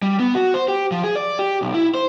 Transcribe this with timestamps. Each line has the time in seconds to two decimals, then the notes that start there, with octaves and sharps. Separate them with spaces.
0.02 G3
0.20 B3
0.35 F#4
0.54 C5
0.68 G4
0.92 F3
1.04 G#4
1.16 D5
1.39 G4
1.62 B1
1.74 E4
1.95 C5